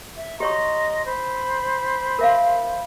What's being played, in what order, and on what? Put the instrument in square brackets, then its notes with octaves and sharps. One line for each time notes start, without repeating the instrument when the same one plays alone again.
[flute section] E5
[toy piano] G4 C#5 C#6 [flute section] D#5 A#5 C6
[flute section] C5 B5
[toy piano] A#4 E5 F5